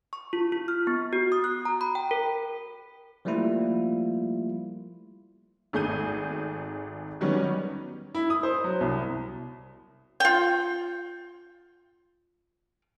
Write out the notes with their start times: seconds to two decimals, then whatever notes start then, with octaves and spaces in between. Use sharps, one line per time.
0.13 C#6
0.33 F4
0.52 F4
0.68 F6
0.87 B3
1.13 F#4
1.32 D#6
1.44 F#6
1.65 A#5
1.81 B5
1.95 G5
2.11 A#4
3.25 F3 G3 A3 A#3 E4 F4
5.73 G#1 A3 G#4 G6 D#7
7.21 D#3 F#3 G3 B3 C#4
8.15 E4
8.30 D#6
8.43 C5
8.64 F#3
8.81 C2
10.20 F4 G5